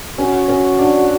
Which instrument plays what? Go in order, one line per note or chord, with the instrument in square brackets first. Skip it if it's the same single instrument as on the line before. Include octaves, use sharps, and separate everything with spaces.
[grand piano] C#4 [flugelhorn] F#4
[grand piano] C#4
D4